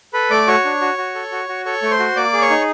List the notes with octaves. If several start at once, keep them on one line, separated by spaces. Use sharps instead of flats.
A4 B4 B5
A3 D5 D6
F#4 C#5 C#6
D4
F#4
F#4
A4
F#4
F#4
A4 C#5 C#6
A3
C5 C6
F#4
A#3 D5 D6
G#4
C#5 C#6
D#4